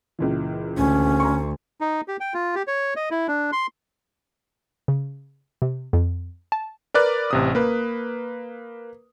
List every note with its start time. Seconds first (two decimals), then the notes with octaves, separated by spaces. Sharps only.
0.19 C#2 A#2 E3
0.77 D2 C#4
1.20 A#5 C6 C#6
1.81 D#4
2.08 G4
2.20 G5
2.34 F4
2.55 G4
2.67 C#5
2.96 D#5
3.11 E4
3.28 D4
3.52 C6
4.88 C#3
5.62 C3
5.93 F2
6.52 A5
6.94 A#4 B4 D5 F#6
7.31 A1 C3 D#6
7.55 A#3 B4